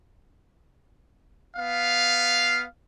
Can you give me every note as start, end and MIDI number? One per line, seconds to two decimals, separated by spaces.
1.57 2.65 59
1.57 2.65 77